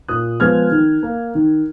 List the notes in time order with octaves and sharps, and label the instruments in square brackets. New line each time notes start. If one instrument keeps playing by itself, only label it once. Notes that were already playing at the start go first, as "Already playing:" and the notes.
[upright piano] A#2 D#6 F#6
F3 G#3 B3 F6 G#6
D#3
A#3
D#3